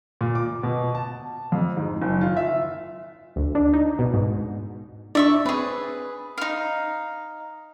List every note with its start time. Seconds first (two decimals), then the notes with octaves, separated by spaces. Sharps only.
0.21 A#2
0.35 D6
0.63 B2
0.95 A5
1.52 F2
1.77 G#2
2.02 F#1
2.21 F4
2.37 E5
3.36 D2
3.55 D4
3.74 D#4
3.99 B2
4.14 G#2
5.15 D4 D5 E5 C#6
5.46 C4 G#4 B4
6.38 D#4 F5